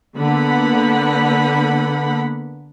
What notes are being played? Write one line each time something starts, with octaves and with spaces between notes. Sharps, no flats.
D3 A#3 B3 F#5 B5